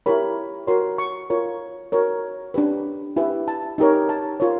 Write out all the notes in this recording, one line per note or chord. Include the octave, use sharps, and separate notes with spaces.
E4 G4 A#4 C#5 B5
F#4 A#4 C#5 C6
C#6
F4 A#4 C#5
F#4 A#4 C#5
D4 G4 B4
E4 G4 B4
A5
D#4 G4 A#4 C#5
A5
F4 A#4 C#5